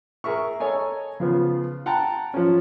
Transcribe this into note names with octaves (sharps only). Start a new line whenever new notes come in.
G#4 A#4 E5 C#6
A4 C#5 D#5 G#5 A#5
C#3 F3 B3
F#5 G5 A5 A#5
F3 C#4